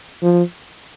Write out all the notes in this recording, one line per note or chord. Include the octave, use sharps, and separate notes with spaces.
F3